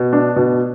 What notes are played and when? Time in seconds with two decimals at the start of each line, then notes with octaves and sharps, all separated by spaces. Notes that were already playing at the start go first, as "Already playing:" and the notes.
Already playing: B2
0.13 D4
0.36 B2